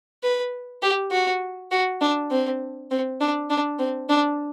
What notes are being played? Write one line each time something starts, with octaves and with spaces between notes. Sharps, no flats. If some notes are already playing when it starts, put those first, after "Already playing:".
B4
G4
F#4
F#4
D4
C4
C4
D4
D4
C4
D4